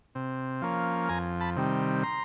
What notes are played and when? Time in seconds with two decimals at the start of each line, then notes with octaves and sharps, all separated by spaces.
0.15 C3
0.62 F3 A#3 C#4
1.09 F2 G#5 A#5
1.40 A5 B5
1.56 C3 D#3 G3
2.03 A#5 C6